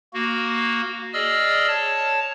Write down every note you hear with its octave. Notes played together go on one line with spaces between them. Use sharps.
A#3 F#4
G#4 D5 D#5 E6 F6
C#5 A5